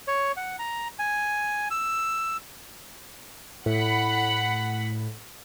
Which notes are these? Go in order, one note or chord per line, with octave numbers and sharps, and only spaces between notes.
C#5
F#5
A#5
G#5
E6
A2 F#5 B5